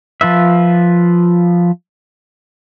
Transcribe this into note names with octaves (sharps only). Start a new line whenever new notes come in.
F3 F4 B4 E5